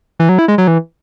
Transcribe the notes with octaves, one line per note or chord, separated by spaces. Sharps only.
E3
F#3
E4
G#3
F#3
E3